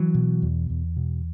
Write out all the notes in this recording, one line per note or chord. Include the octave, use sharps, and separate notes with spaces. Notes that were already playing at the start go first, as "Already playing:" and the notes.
Already playing: E3 F#3
B2
E2
E2
B2